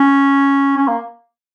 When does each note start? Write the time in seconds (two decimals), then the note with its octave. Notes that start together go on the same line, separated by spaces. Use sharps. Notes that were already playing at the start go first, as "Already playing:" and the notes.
Already playing: C#4
0.77 C#4
0.88 A#3